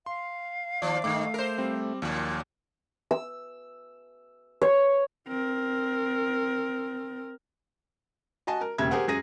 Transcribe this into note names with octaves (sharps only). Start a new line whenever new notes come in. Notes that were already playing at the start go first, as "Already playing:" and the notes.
F5 C6
D#2 F3 D5
G2 D#3 A3 D6
A#4 C5
G3 C4
D#2 A#2 F3
E6
C#5
C4 A#4
F#4 D#5 G#5 A5
A#4
E1 D#2 C#3 E5 G#6
G4 G#4 A#4 C5 F#5
F#2 G#4 A#6 D#7